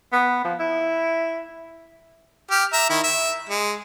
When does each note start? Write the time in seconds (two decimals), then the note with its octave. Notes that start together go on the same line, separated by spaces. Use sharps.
0.13 B3
0.45 F3
0.60 E4
2.51 G4 F6
2.73 E5 A#5
2.90 D#3 E4
3.04 E5
3.49 G#3